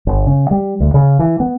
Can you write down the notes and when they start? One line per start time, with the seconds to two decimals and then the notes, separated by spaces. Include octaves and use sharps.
0.07 G1
0.27 C#3
0.51 G3
0.80 D2
0.94 C#3
1.19 E3
1.40 B3